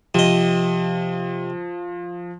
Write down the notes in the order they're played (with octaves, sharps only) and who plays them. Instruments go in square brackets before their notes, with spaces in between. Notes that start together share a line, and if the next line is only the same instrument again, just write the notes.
[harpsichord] C3 D#5 [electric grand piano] F3